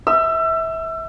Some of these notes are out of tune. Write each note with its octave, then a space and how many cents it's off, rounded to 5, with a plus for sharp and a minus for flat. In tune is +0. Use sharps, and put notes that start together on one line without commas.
E5 -20 E6 +30